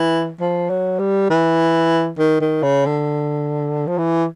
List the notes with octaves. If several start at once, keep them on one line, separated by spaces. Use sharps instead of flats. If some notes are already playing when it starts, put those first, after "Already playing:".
Already playing: E3
F3
F#3
G3
E3
D#3
D#3
C#3
D3
F3
E3